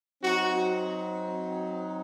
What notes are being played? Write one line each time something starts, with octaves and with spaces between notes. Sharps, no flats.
F#3 C4 D#4 F#4